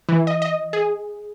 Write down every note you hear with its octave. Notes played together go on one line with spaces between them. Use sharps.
E3
D#5
D#5
G#4